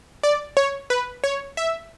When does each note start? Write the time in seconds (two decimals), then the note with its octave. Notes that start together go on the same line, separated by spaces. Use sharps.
0.23 D5
0.57 C#5
0.90 B4
1.24 C#5
1.57 E5